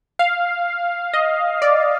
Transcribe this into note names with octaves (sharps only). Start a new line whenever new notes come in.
F5
D#5
D5